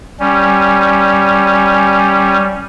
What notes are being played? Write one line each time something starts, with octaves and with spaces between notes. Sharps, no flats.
G3 C#4